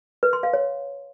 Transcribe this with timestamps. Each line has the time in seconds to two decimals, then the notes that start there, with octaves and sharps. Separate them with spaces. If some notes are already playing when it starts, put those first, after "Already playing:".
0.23 B4
0.33 C6
0.43 F5
0.53 C#5